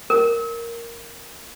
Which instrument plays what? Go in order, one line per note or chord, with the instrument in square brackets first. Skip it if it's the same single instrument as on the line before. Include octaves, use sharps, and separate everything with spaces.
[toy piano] A#4